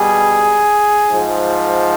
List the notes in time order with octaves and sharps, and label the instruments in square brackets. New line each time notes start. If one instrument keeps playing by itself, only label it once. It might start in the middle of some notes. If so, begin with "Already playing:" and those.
Already playing: [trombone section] B2 G3 G#4
G#2 F3